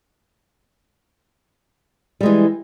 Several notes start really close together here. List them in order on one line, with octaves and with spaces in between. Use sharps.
G3 G#3 E3